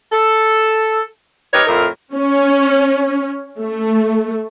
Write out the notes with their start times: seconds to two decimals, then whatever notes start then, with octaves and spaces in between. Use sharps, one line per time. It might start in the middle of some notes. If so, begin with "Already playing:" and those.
0.12 A4
1.53 D#4 G4 A#4 B4 C#5
1.67 F2 A2 A#4
2.13 C#4
3.59 A3